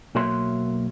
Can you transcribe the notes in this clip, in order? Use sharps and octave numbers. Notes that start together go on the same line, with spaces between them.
B1 A#3 F#4 C#5 E5 C6